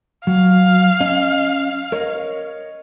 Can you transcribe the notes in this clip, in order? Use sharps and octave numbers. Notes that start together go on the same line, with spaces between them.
F#3 F5
C#4 D#5
A#4 C#5 D#5